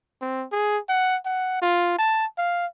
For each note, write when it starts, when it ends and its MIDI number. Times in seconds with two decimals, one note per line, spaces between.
0.21 0.46 60
0.52 0.79 68
0.89 1.17 78
1.25 1.61 78
1.62 1.98 65
1.98 2.26 81
2.38 2.66 77